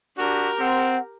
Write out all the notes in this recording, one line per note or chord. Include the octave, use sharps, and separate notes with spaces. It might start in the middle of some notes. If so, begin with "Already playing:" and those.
D4 F#4 G4 A#4
C4 F#5